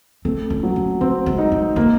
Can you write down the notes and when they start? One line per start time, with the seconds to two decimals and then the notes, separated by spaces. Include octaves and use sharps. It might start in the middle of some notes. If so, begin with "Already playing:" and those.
0.25 A3 C4
0.50 C#4
0.63 F#3
0.76 C#4
1.01 A#3 C4
1.26 G#3
1.38 D#4
1.52 G#3
1.76 A3 A#3